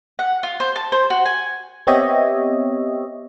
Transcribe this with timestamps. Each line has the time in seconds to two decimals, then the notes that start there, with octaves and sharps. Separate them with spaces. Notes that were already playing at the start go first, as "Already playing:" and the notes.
0.19 F#5
0.43 F4
0.60 C5
0.76 A5
0.92 C5
1.10 F#4
1.26 G#5
1.87 B3 C4 G4 C#5 D#5 E5